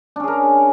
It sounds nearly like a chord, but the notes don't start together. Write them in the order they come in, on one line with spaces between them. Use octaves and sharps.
D4 C#4 G#4 A#4